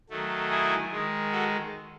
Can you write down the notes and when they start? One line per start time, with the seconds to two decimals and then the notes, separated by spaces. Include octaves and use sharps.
0.10 D#3 F#3 A3
0.50 E4 G#4
0.91 D#3 G#3
1.32 F#4 A4